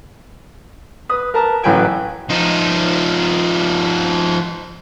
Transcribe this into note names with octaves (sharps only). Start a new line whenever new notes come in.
B4 D#6
A#4 B4 A5 A#5
A1 E3 F#3 B4 G5 G#5
F3 D#4